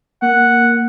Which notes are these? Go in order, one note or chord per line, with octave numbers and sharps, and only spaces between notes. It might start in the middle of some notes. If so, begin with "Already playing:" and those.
A#3 F#5